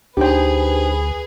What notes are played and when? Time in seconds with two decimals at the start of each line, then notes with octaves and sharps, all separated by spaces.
0.17 D2 D4 D#4 G4 G#4 B4 C5 G5